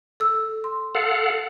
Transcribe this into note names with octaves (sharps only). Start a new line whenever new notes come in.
A4 E6
C6
A4 F5 F#5